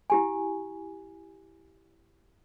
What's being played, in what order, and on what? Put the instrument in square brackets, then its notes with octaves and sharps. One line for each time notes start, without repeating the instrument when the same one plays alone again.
[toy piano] E4 G4 G#5